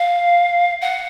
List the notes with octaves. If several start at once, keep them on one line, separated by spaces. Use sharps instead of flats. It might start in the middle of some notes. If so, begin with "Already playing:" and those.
Already playing: F5
F#5